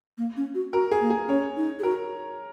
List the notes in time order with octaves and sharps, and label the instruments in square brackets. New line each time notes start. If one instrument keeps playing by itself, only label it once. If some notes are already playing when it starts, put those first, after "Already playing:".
[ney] A#3
C#4
F#4
[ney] F#4 [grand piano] A#4
[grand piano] G#4
[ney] A#3
[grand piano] G#4
[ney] C#4 [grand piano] C#5
[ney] D#4
G#4
[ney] F#4 [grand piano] A#4